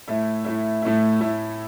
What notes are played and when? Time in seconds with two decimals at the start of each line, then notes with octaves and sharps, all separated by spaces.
0.08 A2 A3 E4
0.45 A2 A3 E4
0.82 A2 A3 E4
1.21 A2 A3 E4